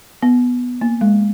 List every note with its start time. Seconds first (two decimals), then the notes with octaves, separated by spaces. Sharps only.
0.22 B3
0.81 A#3
1.01 G#3